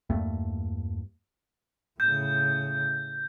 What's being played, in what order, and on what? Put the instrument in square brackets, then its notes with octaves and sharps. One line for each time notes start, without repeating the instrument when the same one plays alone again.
[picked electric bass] E2 G2 A3 A#3
[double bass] A2 C#3 [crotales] G6